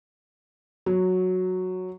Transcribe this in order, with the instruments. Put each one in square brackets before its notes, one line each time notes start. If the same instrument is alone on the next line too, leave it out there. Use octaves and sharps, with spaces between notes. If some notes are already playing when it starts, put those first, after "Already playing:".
[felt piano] F#3